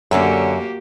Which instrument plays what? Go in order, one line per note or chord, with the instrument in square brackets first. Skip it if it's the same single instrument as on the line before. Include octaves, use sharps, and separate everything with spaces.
[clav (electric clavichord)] F#2 [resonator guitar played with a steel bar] D3 C#4 A4 [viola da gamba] A#3 F#4 G4